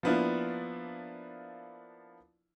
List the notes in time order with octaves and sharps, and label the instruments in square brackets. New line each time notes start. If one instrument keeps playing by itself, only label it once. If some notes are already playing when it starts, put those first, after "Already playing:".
[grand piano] F3 A#3 B3 D4 E4 F4